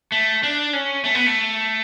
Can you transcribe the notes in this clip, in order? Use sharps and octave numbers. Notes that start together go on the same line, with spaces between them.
A3
D4
C#4
A3
B3
A3